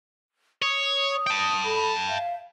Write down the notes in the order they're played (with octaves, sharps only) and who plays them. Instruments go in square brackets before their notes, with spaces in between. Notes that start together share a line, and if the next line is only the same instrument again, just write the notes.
[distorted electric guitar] C#5 [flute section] D#6
[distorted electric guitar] G5 A5
[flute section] A4 B5
E5 F5